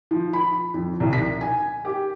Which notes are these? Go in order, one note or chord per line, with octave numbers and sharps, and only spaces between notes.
F3
B5
F2
C2
B6
G#5
G4